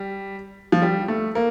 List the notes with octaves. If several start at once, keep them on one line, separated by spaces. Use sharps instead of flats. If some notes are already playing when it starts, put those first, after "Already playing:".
Already playing: G3
F3
G3
A3
A#3